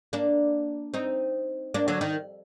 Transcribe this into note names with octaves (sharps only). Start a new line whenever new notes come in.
A#3 D4
C4 D#4
A#3 D4
D3 F#3
D#3